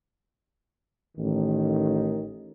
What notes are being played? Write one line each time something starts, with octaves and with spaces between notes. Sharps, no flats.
A1 D#3